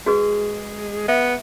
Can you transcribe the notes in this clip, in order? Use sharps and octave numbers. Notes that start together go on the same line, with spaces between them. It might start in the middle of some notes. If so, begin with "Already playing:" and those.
G#3 F#4 G#4 B4
B3 E5